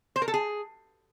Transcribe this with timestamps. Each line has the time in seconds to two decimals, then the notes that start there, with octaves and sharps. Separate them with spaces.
0.16 C5
0.22 A#4
0.28 A4
0.34 G#4